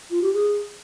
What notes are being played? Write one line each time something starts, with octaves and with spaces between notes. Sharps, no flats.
F4
G4
G#4